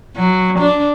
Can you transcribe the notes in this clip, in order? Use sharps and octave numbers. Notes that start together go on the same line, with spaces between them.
F#3
D4